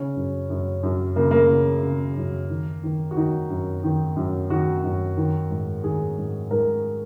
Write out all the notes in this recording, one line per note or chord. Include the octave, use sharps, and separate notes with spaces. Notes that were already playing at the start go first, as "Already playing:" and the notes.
Already playing: C#3 C#4
F#2
F#2
F#2
C#3 A#3
A#3
C#3
C#3
F#2
D#3
D#3
F#4
D#3 D#4
F#2
D#3
F#2
D#3 F#4
F#2
D#3
G#2
D#3 G#4
G#2
G#2 A#4